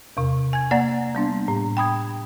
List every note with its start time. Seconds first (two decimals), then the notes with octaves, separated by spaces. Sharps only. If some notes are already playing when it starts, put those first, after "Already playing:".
0.17 E2 C3
0.53 G#5 G#6
0.71 A#3 D5 F#5 A#5 A6
1.15 G3 B3 D4
1.48 A2
1.77 G5 B5 D#6 G#6